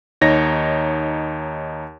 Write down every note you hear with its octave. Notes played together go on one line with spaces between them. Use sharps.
D#2 D#4 C#5 A#6